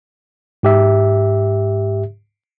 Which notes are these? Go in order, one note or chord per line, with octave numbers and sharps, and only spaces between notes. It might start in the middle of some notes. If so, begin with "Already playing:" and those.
G#2 G4 E5